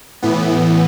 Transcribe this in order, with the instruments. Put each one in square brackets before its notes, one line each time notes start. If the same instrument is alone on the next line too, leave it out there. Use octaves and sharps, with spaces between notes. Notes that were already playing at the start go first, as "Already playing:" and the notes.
[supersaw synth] A2 E3 B3